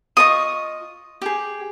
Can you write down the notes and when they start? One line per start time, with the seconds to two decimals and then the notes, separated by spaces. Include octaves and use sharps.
0.17 F4 D#5 C#6 D#6
1.22 G4 G#4